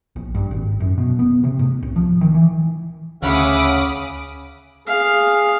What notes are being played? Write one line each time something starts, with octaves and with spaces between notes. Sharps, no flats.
A#1
G2
G#1
F#2
B2
B3
C3
A2
C2
F3
D#3
E3
D2 C#3 C#4 E5 F#5 B5 D6 D#6
G#4 F5